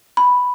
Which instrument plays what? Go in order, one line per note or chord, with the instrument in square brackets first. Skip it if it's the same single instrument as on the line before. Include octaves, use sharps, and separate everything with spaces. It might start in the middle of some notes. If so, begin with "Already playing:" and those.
[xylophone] B5